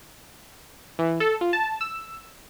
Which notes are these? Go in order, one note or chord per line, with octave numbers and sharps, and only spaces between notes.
E3
A4
F4
A5
E6